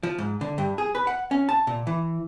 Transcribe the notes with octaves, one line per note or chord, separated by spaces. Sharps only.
F3
G#2
D3
G2
G#4
B4
F#5
C#4
A5
A#2
E3